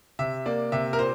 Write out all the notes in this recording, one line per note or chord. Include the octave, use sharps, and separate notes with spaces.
C3 E5
A#3 D5
C3 E5
A#4
A#2 C5